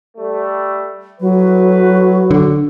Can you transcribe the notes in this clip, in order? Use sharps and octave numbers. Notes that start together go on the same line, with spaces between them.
G3 A3
A2 F#3 B4
D3